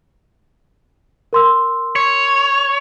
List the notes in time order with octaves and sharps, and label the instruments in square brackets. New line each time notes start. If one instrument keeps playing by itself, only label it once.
[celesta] A#4 C6 E6
[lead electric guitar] C#5